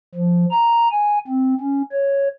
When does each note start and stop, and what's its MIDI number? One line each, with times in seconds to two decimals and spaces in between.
0.15 0.45 53
0.51 0.88 82
0.92 1.19 80
1.27 1.54 60
1.60 1.82 61
1.92 2.28 73